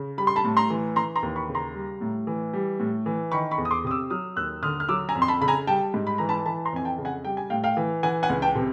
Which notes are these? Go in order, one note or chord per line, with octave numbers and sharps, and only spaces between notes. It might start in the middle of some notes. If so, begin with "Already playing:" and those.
Already playing: C#3
G3 B5
C6
A5 B5
A2
A#5 C6
E3
E3 A#5 C6
A#5 C6
D#2
B5 C#6
C#3
A#5 C6
G3
A2
E3
G3
A2
E3
D#3 B5 C#6
B5 C#6
E2
D#6
C6 D6
C3 D#6
D6 E6
F#3 D#6 F6
D#2 E6 F#6
D3 D#6 F6
F6
F#3 D6 E6
G#5 A#5
F2
C6
A5 B5
C#3 B5
G#5 A#5
G3 G5 A5
G#2
B5
E3 A#5
A5 B5
E3 A5 B5
A#5 C6
F2 G#5
G5 A5
C#3
F#5 G#5
G3 G5
G#5
A2 F5 G5
F5 G5
E3
E3 F#5 G#5
F#5 G#5
C#2
G5 A5
C3